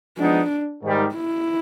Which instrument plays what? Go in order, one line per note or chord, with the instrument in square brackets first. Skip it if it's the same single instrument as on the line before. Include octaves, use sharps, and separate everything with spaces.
[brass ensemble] F3 G#3 B3 D#4 [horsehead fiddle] D4
[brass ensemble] G#2 D#3 G3
[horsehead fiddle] E4